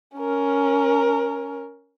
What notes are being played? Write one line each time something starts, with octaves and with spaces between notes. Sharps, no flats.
C#4 A#4